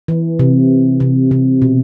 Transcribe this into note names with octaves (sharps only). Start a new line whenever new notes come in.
E3
C3
C3
C3
B2